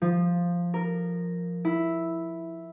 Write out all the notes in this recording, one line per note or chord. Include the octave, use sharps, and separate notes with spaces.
F3
A#4
E4